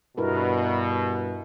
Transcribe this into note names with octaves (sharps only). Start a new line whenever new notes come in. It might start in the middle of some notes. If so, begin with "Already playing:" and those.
G2 B2 E4 A#4 B4